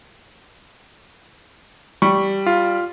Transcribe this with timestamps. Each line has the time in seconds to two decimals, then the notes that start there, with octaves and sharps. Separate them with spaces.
2.02 G3 C#6
2.46 F4